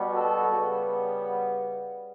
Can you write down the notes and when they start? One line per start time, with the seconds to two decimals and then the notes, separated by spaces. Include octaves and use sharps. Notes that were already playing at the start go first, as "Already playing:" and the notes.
Already playing: B2 G3 B3
0.13 F#4 A4
0.48 C#3 G3 B3